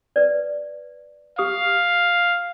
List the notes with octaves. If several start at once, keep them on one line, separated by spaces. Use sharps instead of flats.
B4 D5
G4 F5 D#6